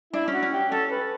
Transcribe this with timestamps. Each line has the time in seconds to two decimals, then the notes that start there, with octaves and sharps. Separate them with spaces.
0.13 D4 E4
0.28 C#4
0.33 F#4
0.43 C#4
0.52 G4
0.71 C#4 A4
0.90 B4